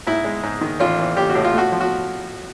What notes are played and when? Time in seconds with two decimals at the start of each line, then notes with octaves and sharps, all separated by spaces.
0.07 G#2 E4
0.25 G#3
0.43 G#2
0.61 D#3
0.80 A1 F4
0.99 E3
1.17 A1 G4
1.30 F#4
1.35 A2
1.44 F4
1.54 A3 F#4
1.72 F3
1.81 F#4